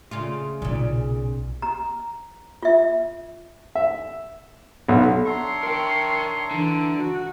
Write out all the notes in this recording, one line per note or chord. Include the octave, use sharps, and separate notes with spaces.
C#3 A3 F4
B1 A#2 C#3
A#5
F4 E5
E5
B1
D4 C#5 E5 A#5 C6
A#4 G5
D3 E3
F#4